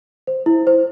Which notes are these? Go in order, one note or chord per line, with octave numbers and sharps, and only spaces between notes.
C5
E4
C5